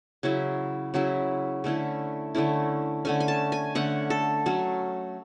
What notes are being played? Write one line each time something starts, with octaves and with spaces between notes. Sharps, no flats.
C#3 F#3 C#4 E4
C#3 F#3 C#4 E4
D3 A3 C#4 E4
D3 A3 C#4 E4
D3 A3 C#4 G#5
G#5
A5
G#5
D3 A3 C#4 F#5
A4
F#3 A3 C#4